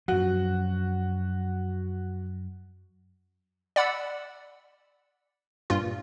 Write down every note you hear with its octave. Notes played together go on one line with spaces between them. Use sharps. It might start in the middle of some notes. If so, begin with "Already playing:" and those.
F#2 F3 F#4
D5 F#5 B5 E6
G2 A#2 F4